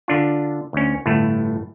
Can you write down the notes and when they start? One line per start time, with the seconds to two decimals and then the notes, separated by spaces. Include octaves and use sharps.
0.08 D3 D4 F4
0.73 D2 C#4
1.06 G1 A2 A3